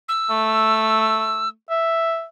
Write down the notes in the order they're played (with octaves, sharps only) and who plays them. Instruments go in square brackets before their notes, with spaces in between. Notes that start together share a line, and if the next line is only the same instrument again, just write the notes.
[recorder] E6
[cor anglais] A3
E5